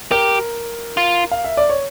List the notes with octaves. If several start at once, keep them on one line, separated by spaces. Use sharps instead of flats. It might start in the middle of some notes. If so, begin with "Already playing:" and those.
G4 A#4
F4
F5
E5
D5
C#5